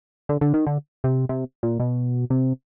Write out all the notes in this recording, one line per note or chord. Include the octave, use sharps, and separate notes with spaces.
D3
D3
D#3
D3
C3
C3
A#2
B2
C3